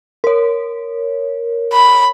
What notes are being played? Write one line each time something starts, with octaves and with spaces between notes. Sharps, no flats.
A#4 C#5
B5